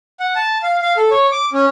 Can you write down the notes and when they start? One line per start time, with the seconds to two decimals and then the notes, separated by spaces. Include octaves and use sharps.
0.20 F#5
0.36 A5
0.63 F5
0.82 F5
0.97 A4
1.11 C#5
1.32 D6
1.53 C#4